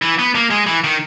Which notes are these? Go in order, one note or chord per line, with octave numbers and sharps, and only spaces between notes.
E3
B3
A#3
G#3
E3
D#3